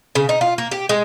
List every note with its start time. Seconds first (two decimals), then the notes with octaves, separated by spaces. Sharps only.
0.15 C#3
0.29 D#4
0.41 F4
0.58 A#3
0.71 G4
0.89 G#3